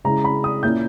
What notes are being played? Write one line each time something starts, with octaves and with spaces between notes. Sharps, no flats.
C#3 G#3 C#4 E4 A#5
B5
D#6
A#2 A#3 C#4 E4 G6